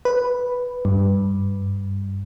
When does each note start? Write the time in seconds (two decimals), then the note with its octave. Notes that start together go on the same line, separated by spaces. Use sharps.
0.05 B4
0.85 G2